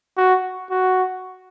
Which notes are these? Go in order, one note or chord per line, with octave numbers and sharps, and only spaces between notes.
F#4
F#4